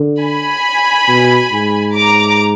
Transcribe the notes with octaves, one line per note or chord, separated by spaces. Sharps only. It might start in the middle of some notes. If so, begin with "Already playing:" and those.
Already playing: D3
G#5 B5
B2
G#2
A#5 D6